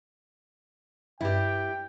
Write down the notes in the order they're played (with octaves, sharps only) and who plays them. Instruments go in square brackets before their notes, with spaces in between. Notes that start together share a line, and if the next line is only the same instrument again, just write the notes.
[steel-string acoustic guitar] G2 [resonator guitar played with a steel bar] E4 G4 [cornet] G5